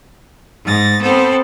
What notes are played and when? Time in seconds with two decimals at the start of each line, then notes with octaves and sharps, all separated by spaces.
0.65 G#2 A6 A#6
1.01 B3 C4 A4